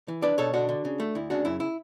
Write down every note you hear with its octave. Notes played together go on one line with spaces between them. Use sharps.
E3
D4 B4 D5
B2 A4 C#5
D3 D4 F#4
D3
C#3
A3
D2 E4
C#3 D4 F#4
F#2 E4
E4